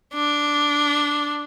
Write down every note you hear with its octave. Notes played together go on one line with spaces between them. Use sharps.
D4